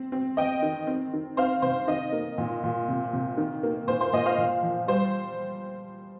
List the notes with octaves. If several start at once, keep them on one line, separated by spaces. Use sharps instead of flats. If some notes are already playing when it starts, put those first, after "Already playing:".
Already playing: C4
C4
C4 D#5 G5
D#3
C4
D#3
C4 C5 F5
C3 C5
D#3 D#5
A#3
A#2
A#2
C3
C3
D#3
A#3
A#2 C5
C5
A#2 D#5
C5 F5
A#2
F3
G3 C5